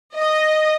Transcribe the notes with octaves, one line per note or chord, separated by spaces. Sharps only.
D#5